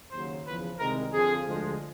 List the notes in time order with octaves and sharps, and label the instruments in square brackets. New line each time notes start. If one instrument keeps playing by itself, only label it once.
[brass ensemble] D#2 C#3 F#3 C5
E2 C#3 F3 B4
C2 C3 D#3 G#3 A#4
F2 D3 F3 G#4
D2 D3 F3 G#3